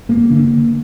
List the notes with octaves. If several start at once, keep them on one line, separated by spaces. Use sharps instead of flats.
G1 A#3
D3